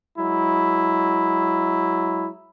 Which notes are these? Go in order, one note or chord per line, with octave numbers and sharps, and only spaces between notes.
F#3 G#3 E4